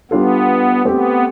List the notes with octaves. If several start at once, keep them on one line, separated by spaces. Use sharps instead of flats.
G3 B3 D4 F4 A4
A3 B3 C4 G4